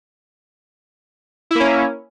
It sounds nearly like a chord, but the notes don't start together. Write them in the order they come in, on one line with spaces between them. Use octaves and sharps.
E4 A#3 C#4